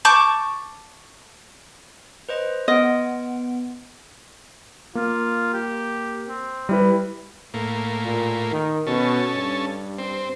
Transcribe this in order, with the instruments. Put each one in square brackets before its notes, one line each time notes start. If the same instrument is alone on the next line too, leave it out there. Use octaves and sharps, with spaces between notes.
[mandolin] A5 C#6 D6 G6
[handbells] B4 C5 D#5
[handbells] B3 F#5 D7 [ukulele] D#5
[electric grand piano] A#3 [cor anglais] F4
[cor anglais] G4
C4
[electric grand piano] G3 E4 B4
[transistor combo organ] A2 A#3
[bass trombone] A#2
D#3
[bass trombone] B2 [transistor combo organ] C#4 A4
[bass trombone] G2
[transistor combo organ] C4